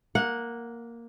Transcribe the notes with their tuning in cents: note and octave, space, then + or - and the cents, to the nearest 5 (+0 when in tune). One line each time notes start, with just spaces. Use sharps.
A#3 +0 F#5 -15